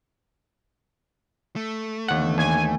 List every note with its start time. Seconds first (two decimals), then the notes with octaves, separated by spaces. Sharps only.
1.56 A3
2.08 D#2 D3 E3 B3 F#5
2.38 D#2 G#5